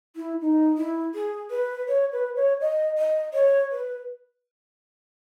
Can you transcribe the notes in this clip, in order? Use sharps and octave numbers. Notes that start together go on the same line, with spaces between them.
E4
D#4
E4
G#4
B4
C#5
B4
C#5
D#5
D#5
C#5
B4